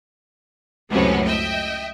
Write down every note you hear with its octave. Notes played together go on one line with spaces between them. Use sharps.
C#2 F#2 A2 C3 B3 C#4
D#5 E5 G5